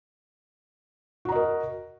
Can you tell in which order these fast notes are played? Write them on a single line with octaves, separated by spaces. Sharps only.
F#4 A#5 D#5 A#4